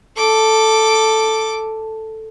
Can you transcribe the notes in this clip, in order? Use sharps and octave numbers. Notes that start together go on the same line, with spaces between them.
A4 D6